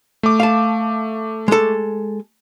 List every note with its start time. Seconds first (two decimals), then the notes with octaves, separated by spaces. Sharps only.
0.23 A3 D6
0.40 F5 A5
1.48 G#3 A4